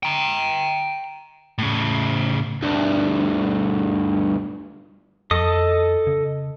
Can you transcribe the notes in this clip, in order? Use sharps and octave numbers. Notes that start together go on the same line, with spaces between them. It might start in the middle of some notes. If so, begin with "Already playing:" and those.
G5 A#5
A2 C#3
D2 G2
F2 A4 D#5 D#6
C#3